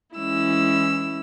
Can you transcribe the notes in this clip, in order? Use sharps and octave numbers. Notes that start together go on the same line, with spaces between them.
E3 G#3 C#4 E4 E6